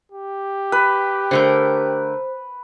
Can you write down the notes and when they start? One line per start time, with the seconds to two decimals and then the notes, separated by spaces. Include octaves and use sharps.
0.12 G4
0.72 B4
1.31 D3 A3 A#4 C5